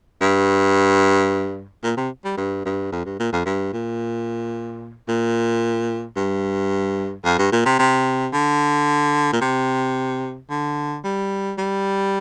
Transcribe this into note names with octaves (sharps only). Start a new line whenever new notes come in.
G2
A#2
C3
G3
G2
G2
F2
G2
A#2
F2
G2
A#2
A#2
G2
F2
G2
A#2
C3
C3
D3
A#2
C3
D3
G3
G3